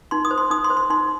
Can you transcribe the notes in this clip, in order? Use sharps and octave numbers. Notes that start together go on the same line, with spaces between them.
D#4 C6
D#6
C5
C6
D#4 D#6
C6
C5
C6
D#4 C6